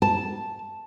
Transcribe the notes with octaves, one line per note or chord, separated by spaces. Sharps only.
A5